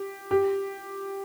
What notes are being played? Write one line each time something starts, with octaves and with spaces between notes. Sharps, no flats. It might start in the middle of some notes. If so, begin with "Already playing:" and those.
Already playing: G4
G4